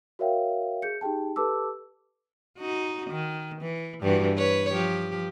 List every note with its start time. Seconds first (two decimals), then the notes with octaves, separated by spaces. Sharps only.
0.19 F#4 A#4 C#5 E5 F5 G5
0.82 G#4 G6 C#7
1.01 D#4 G4 G#4 G5 A5
1.36 G4 A4 B4 A5 D6 E6
2.57 D#4 F#4
3.10 D#3
3.61 E3
4.02 G2 E3 F#4
4.36 B4 C#5
4.72 F3 G4